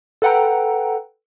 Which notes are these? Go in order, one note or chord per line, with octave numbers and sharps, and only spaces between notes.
A4 B4 F#5 G5 A#5